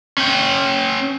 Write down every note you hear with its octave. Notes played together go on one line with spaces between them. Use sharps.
C#4 G5